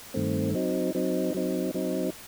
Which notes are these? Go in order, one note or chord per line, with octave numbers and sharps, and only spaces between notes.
G2 D#3 A3 C4
F#3 C4 D#4
F#3 C4 D#4
F#3 C4 D#4
F#3 C4 D#4